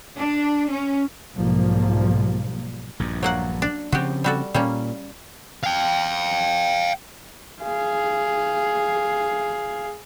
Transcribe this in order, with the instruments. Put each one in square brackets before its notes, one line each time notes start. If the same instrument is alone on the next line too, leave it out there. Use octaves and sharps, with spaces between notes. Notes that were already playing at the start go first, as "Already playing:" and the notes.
[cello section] D4
C#4
[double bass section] B1 G#2 F3 G3 A#3
[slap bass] A#1 G2
[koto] F#3 A#3 F#5
D4
[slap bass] C#3 F3 C4 [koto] F#4 G4
[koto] G3 F#4 A4
[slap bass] A#2 [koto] G3 A#3 C#4
[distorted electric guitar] F5 G5
[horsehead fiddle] G#4 F5